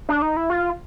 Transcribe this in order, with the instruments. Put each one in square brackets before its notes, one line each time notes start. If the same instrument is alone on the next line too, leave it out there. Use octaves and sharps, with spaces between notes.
[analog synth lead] D4
D#4
E4
F4